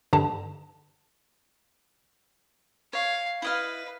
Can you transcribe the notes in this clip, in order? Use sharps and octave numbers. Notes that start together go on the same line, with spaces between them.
G2 D3 A5
C#5 F5
E4 B4 D#5 F5